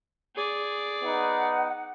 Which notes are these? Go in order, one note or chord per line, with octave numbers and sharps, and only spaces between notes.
G#4 D5
B3 D#4 B4 F#5